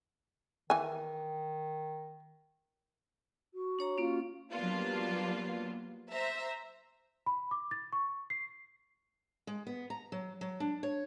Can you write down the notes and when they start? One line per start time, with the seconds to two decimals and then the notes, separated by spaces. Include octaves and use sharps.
0.70 D#3 E3 G#5
3.54 F#4
3.79 D4 C#5 A#5
3.98 A#3 C#4 F4
4.52 F#3 G3 A#3 B3 D4 F4
6.10 C5 E5 A#5
7.26 B5
7.51 D6
7.71 A6
7.93 C#6
8.30 C7
9.47 G#3
9.67 B3
9.90 A#5
10.12 F#3
10.41 F#3
10.60 D4
10.83 C#5